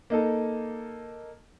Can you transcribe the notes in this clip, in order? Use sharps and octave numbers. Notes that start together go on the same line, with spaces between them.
A#3 D#4 A4